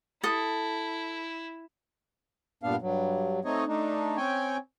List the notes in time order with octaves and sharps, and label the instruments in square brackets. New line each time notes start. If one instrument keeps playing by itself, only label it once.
[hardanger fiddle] E4 [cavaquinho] A4 D#6
[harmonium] G2 A#2 B3 D4 F5
G2 F#3
A3 C4 D#4 C#5 D#5
A3 D4 D#4
C4 C#4 C#5 G5 G#5